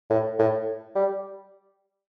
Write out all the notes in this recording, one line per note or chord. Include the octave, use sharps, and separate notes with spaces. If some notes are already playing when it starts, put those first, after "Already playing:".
A2
A2
G3